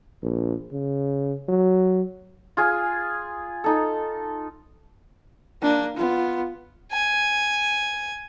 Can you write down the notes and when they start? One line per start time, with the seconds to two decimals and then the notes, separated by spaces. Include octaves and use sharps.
0.23 A#1
0.72 C#3
1.48 F#3
2.57 F4 G#4 G#5
3.64 D#4 A4
5.62 A#3 D4
5.97 B3 F4
6.92 G#5